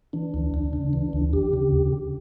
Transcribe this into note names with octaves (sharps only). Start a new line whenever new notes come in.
E3 D4
D2
D2
C#3
E3
D2
D#2 G4
C#3